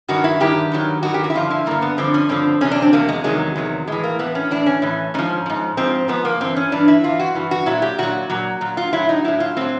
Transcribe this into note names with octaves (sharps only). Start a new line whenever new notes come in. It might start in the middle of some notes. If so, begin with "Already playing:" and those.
G2 D#3 F#3 F#4
E4
G2 D#3 F#3 G4
G2 D#3 F#3
G2 D#3 F#3 F#4
G4
F#4
E4
G2 D3 F3 F4
E4
G2 D3 F3 A#3
B3
G2 D3 F3 C4
C#4
G2 D3 F3 C4
E2 C3 F#3 C#4
D4
C4
E2 C3 F#3 A#3
G#3
E2 C3 D#3 F#3 G#3
E2 C3 D#3 F#3
A2 E3 G#3
A#3
A2 E3 B3
C#4
A2 E3 D4
C#4
A2 E3
G#2 F3 C#4
G#2 F3
G#2 F3 C4
G#2 F3 B3
A#3
G2 E3 C4
C#4
G2 E3 D4
E4
G2 E3 F4
F#4
G2 E3
F#4
A#2 F#3 E4
G4
A#2 F#3 F#4
A#2 F#3
A#2 F#3
F4
A2 F#3 E4
D#4
A2 F#3 E4
F4
A2 F#3 C4